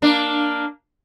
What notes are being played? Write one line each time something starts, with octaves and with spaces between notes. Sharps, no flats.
A#3 D4